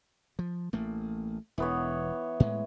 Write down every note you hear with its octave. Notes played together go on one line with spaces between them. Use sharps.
F3
A1 A3 A#3
E1 E3 B3 C#5
A2 G#3